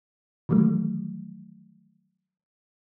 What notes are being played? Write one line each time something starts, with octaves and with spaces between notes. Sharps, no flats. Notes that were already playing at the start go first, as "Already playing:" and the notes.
D#3 E3 F#3 G3 A3